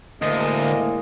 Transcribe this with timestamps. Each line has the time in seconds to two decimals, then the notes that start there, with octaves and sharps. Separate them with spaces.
0.22 D2 A2 G#3 A#3 D#5